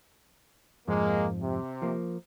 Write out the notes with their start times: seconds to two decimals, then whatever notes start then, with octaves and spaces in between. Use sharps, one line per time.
0.87 F2 G#2 F3 G#3 A#3
1.40 C3
1.82 F3 A#3